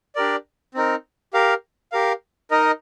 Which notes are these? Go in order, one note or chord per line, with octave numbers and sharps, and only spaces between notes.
D4 G4 A#4 D5
C4 D#4 A#4
G4 A#4 F5
G4 A#4 F5
D#4 A#4 D#5